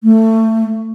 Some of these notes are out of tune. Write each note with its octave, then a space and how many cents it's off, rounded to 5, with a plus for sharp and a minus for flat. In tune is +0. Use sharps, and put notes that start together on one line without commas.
A3 +20